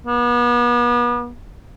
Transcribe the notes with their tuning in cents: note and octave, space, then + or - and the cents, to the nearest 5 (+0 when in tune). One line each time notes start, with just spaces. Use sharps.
B3 -40